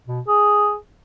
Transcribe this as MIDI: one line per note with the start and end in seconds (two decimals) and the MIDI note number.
0.07 0.20 47
0.28 0.75 68